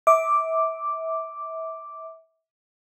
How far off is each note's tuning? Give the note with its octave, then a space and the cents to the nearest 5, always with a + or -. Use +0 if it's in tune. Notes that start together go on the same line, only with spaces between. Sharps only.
E5 -30 D6 +0